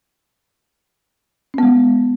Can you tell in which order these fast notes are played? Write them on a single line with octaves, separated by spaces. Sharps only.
C#4 B3 G#3